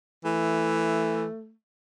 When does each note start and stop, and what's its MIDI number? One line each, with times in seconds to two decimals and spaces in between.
0.25 1.26 52
0.25 1.53 57